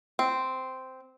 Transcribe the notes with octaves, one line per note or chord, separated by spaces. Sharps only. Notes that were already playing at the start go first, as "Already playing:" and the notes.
C4